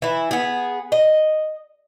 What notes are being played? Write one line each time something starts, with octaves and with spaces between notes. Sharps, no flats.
E3 E4
B3 G#4
D#5